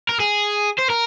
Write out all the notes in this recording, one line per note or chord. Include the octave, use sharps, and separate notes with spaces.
A#4
G#4
C5
A#4